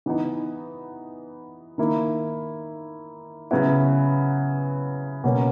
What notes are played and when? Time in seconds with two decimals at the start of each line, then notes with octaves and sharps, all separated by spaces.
0.06 E3 B3 D#4
1.78 D#3 A#3 E4
3.51 C#3 F#3 B3 E4
5.24 B2 F#3 A#3 C#4